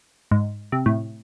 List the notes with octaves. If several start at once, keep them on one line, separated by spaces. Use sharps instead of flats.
G#2
C3
A2